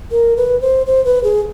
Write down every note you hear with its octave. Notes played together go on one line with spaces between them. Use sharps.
A#4
B4
C5
C5
B4
G#4